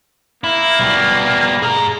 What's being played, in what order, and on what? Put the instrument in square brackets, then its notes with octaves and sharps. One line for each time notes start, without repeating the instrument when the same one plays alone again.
[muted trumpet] A#3 [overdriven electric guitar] E4
[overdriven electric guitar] B2 G3
G#4 A#5